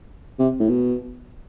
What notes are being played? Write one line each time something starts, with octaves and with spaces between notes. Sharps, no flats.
C3
A2
B2